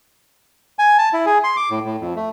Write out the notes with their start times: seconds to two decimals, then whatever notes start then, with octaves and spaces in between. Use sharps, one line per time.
0.79 G#5
0.98 A5
1.13 E4
1.26 G#4
1.44 C6
1.57 D6
1.70 A2
1.85 A2
2.01 F2
2.16 A3